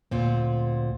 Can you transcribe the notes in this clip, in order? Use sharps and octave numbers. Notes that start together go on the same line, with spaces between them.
D2 A#2 C4